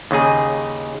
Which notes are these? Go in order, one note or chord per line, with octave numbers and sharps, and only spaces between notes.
D#2 C#3 D#4 G#4